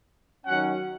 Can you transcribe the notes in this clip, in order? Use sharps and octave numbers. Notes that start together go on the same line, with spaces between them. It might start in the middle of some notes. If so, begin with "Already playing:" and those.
D#3 F#3 C#4 F#5